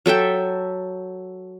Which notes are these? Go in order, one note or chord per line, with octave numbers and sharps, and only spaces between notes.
F#3 A4 E5 G5